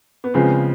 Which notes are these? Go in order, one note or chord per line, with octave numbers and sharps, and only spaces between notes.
B3
C#3 F3 G#3 B3 C4